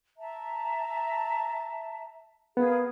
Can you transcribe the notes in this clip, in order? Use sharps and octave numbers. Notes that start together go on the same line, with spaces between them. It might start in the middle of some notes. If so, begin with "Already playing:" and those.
E5 A5 A#5
B3 G#4 A#4 F5